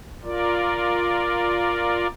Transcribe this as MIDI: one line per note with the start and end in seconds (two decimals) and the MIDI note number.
0.24 2.07 65
0.24 2.07 70
0.24 2.07 74